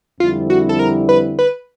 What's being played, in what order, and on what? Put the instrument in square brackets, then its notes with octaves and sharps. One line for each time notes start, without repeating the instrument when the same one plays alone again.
[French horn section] F2 D3 G3 C4 E4 [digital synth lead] F4
[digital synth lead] F#4
A4
A#4
B4
B4